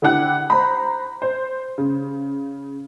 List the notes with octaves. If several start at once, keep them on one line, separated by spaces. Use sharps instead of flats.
D3 E4 G4 F#5 F#6
C5 A#5 B5
C5
C#3